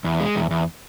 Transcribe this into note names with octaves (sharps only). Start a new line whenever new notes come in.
E2
G#3
E2
E2